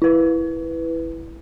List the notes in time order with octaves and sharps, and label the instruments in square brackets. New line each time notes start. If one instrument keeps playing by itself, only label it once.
[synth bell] E4 B4